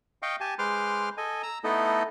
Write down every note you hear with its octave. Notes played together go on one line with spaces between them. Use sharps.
D#5 F5 G5 C#6
G4 G#5 A5
G#3 B4 C5 C6 D6 F6
A4 D#5 G#5
A#5 E6
A3 B3 D#4 E4 A4 D#5